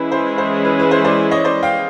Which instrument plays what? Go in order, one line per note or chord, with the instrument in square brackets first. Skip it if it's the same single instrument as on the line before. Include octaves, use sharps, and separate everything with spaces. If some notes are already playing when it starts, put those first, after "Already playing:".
Already playing: [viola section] E3 G#3 C#4 E4 G#4 [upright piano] B4
[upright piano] C5
C5
B4
B4
C5
C5 D5
C#5 D#5
C5 D5
F5 G5